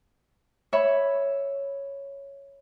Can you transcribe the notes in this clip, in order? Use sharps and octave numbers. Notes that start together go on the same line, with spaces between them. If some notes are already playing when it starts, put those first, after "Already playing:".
C#5 E5 B5